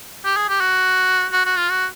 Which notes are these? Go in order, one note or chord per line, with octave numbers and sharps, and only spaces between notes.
G4
G#4
G4
F#4
F#4
F#4
F4
F#4